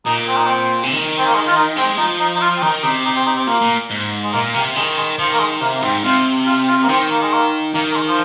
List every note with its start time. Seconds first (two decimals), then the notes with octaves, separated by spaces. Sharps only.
0.06 A#2 D#4
0.27 C4
0.37 D#4
0.47 C4
0.83 C3
0.92 D#3
1.18 C4
1.26 A#3
1.34 G#3
1.47 F4
1.56 D#4
1.77 G#3 C4
1.98 F3 D#4
2.19 D#4
2.35 D#4
2.41 F4
2.57 C4
2.62 D#3 D#4
2.83 C3 D#4
3.05 D#4
3.16 C4
3.26 D#4
3.36 C4
3.47 A#2 A#3
3.61 A#2
3.90 G#2
4.24 G#3
4.33 A#2 A#3
4.54 C3 A#3
4.76 D#3 G#3
4.97 G#3
5.18 D#3 F3
5.33 A#3
5.39 G#3
5.61 C3 A#3
5.76 A#3
5.82 G#2 C4
6.04 C3 F4
6.46 F4
6.67 F4
6.83 A#3
6.89 D#3 C4
7.11 A#3
7.22 G#3
7.33 A#3
7.74 D#3 A#3
7.91 A#3
7.95 G#3
8.07 F3